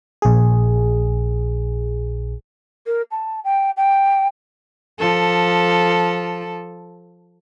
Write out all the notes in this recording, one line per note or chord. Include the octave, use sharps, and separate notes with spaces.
A#1 G#4
A#4
A5
G5
G5
F3 A4